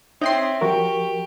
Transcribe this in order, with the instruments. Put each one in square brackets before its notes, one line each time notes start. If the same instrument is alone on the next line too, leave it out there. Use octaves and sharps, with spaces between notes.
[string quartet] C4 [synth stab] D#4 G5 C6 [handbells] C#5 E5
[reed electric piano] F3 F#4 A#4 [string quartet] G4 [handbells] C#6